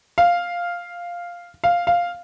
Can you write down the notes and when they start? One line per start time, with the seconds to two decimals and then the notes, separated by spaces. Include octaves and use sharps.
0.18 F5
1.64 F5
1.87 F5